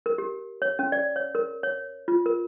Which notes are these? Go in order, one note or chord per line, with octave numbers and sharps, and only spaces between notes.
A#4
G4
C#5
C#4
D5
C#5
A#4
C#5
F4
A#4